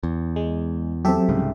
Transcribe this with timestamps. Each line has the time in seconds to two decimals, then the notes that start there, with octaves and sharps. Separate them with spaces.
0.03 E2
0.36 G#3
1.05 F#3 C4 G4 A4 E5
1.29 C2 G#2 C#3